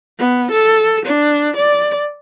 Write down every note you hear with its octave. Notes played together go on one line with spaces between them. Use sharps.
B3
A4
D4
D5